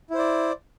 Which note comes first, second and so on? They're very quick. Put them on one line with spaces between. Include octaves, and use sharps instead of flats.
E4 C5 D5